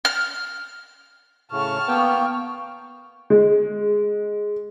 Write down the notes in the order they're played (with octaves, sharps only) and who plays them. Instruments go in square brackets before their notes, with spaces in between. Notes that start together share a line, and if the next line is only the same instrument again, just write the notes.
[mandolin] F6
[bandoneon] A2 C#3 [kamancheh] A5 F6 [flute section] C#6
[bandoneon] A#3 G5 [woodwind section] B3
[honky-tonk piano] G#3